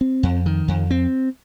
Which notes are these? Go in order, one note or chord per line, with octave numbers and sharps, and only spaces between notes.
C4
F2
D#3
F2
C4